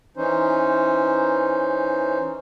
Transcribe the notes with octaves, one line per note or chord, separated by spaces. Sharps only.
E3 C#4 D#4 C5